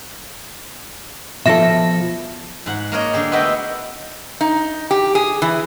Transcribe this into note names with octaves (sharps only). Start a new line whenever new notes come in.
B2 F3 A4 E5 A#6
G#2 F#5
A#3 A#4 C#5 D#5
D3 G#3 G4
A3 B3 F#4 D#5 E5 G5
D#4
G4
G#4
E3